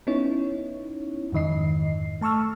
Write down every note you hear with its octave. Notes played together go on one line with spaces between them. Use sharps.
B3 C#4 D#4 E4 C#5
F2 G#2 D#3 D#5 C7
A3 A5 C#6 E6 F6